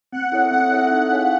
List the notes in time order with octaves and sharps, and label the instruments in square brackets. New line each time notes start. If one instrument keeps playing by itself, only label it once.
[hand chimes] C4 [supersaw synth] F#5
[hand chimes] E4 A4 C#5 E5
[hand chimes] C4 [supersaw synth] F#5
[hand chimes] E4 A4 C#5 E5
D#4
G#4 C#5 F5 G#5